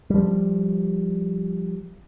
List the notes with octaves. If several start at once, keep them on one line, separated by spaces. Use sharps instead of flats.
F3 G3